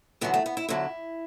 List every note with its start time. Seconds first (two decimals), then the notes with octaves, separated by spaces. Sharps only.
0.21 E2 D3 F#3 B3
0.34 A3
0.46 B3
0.57 E4
0.69 E2 D3 F#3 E4